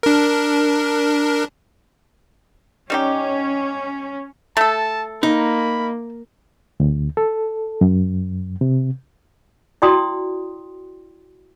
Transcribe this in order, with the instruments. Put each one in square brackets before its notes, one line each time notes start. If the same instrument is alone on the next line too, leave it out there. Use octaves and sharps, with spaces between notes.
[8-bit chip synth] D4 A#4
[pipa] G3 D#4 G4 [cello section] C#4
[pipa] A3 A4 [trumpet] A5
[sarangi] A#3 [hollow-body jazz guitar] D#4 [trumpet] B5
[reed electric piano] D2
A4
F#2
C3
[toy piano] E4 F#4 D5 G5 C6 D#6